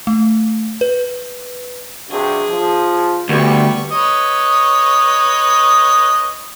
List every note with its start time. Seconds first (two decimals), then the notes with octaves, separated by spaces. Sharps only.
0.07 A3
0.81 B4
2.10 G2 C3 F#4 G#4
2.50 F3
3.29 D2 G3 B3 C#6
3.91 B4 C#5 D#5